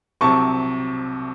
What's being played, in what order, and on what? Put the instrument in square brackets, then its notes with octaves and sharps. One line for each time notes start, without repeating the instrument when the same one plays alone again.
[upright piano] C2 C3 F#3 A5 C#6